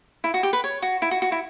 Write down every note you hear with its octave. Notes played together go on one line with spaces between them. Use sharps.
E4
F#4
G4
B4
C#5
F#4
E4
F#4
F#4
E4